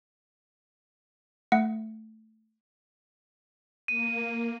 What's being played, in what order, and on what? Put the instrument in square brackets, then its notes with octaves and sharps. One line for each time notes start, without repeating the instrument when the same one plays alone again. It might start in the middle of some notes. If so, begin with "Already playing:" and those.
[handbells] A3 F#5
[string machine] A#3 [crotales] D#7